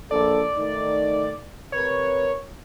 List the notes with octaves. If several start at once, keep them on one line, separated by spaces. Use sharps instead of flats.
A#1 A4 D5
D#3 A3 D#4
C3 A#4 B4 C#5